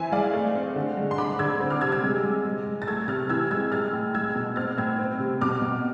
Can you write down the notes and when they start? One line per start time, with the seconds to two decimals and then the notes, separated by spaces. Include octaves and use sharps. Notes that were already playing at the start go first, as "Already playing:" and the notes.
Already playing: E3 C4 E5 G#5
0.12 G#3 D5 F5
0.33 A3
0.55 C4
0.76 D3
0.97 G#3
1.11 C6
1.18 D3 B5 D6
1.39 D3 E6 G#6
1.60 C4
1.70 D6 F6
1.81 C3 E6 G#6
1.92 E6 G#6
2.03 G#3
2.23 G#3
2.45 G#3
2.66 G#3
2.82 A6
2.87 A3 E6 G#6
3.08 C3 F6 A6
3.29 E3 E6 G#6
3.51 G#3 E6 G#6
3.72 G#3 F6 A6
3.93 A2
4.15 G#3 E6 G#6
4.36 B2
4.56 C4 F6 A6
4.78 A2 E6 G#6
4.99 C4
5.19 C3
5.41 B2 D6 F6
5.62 B2